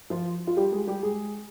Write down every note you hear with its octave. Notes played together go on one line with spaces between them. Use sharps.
F3 F4
F4
G3 G4
G#3 G#4
G3 G4
G#3 G#4